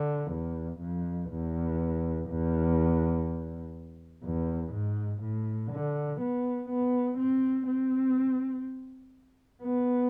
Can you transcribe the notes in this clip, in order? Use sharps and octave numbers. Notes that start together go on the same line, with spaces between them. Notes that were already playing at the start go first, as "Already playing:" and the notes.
Already playing: D3
E2
F2
E2
E2
E2
G#2
A2
D3
B3
B3
C4
C4
B3